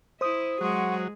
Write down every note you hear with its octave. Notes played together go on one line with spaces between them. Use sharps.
E4 C5 D#6
F#3 G#3 G#4 F#5 C6 C#6